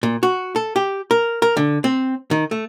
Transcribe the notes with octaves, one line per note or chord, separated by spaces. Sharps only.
A#2
F#4
A4
G4
A#4
A#4
D3
C4
D#3
A3